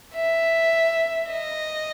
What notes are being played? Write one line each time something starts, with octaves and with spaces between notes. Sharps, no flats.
E5
D#5